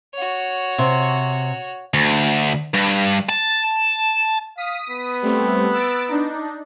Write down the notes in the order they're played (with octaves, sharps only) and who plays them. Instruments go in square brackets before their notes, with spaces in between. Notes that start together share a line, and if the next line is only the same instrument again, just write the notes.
[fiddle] F#4 C#5
[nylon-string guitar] C3
[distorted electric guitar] D2
G2
A5
[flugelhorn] F5 [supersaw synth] D#6 B6
[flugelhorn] B3
[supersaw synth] G3 A3 C4
E6 A6 D7
D4 D#4